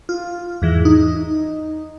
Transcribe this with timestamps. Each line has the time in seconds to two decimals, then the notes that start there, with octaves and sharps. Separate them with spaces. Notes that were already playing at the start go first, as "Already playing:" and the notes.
0.09 F4
0.62 E2 G#2 E3
0.85 D#4